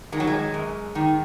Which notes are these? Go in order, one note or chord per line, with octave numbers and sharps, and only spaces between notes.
D#3 G#3
F#3
G#3
F#2
D#3